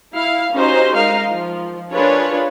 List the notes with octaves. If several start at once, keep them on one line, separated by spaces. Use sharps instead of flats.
E4 F5
C#4 D#4 F#4 G4 C5
G#3 D#4 A#4 F5
F3
D4 F4 G#4 A#4 B4 C#5